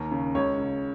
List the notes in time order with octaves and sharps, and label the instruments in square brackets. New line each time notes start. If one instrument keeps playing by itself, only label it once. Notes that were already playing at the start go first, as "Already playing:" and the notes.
Already playing: [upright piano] D#2 A#4
C#3
C#2 C#5
C#3